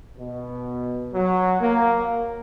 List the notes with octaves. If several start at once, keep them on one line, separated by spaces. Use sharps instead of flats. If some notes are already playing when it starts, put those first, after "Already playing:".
B2
F#3
A#3